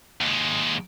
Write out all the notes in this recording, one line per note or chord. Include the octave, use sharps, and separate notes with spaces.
D#2 G#3